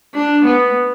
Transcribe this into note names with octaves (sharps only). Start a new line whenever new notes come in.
D4
B3